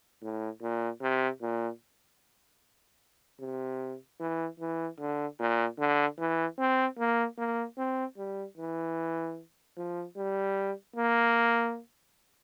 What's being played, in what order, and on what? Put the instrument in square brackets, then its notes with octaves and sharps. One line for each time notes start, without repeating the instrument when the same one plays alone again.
[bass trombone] A2
A#2
C3
A#2
C3
E3
E3
D3
A#2
D3
E3
C4
A#3
A#3
C4
G3
E3
F3
G3
A#3